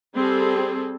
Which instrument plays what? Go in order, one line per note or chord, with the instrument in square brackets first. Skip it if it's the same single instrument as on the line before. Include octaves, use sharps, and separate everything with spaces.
[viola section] G3 C4 G#4 A4